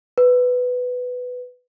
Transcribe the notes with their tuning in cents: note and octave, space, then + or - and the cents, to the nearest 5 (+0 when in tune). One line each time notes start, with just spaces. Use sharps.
B4 +10